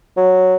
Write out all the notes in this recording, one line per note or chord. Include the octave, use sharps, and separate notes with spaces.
F#3